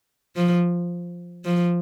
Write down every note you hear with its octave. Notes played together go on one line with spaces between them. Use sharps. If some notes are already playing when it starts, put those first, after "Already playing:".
F3
F3